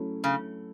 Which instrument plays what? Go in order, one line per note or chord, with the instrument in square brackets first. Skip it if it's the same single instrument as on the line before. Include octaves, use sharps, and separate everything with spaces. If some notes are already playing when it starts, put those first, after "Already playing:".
Already playing: [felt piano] F#3 A3 C#4 E4
[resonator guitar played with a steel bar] C#3